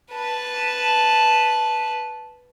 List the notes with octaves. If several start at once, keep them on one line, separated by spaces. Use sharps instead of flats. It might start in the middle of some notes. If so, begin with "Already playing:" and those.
B4 A5